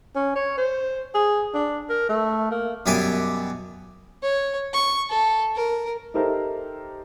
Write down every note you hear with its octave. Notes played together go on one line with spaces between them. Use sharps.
C#4
C#5
C5
G#4
D4
A#4
A3
A#3
F#2 B2 G3 E5 G#5 D6
C#5
C#6
A4
A#4
D#4 G4 A4 A#4 C5 E5